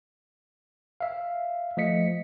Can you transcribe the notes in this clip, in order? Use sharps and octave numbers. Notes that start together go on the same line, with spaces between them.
E5 F5
F3 A3 D#5 B6 C#7